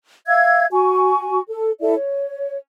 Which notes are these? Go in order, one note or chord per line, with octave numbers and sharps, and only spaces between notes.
E5 F5 E6 G#6
F#4 G#5 C#6
A4
E4 A4 D5 E5
C#5